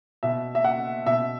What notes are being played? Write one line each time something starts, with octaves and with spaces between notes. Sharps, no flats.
B2 E5
E5
F#5
B2 E5